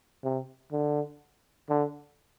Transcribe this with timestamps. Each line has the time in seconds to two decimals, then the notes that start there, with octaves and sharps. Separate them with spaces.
0.24 C3
0.72 D3
1.69 D3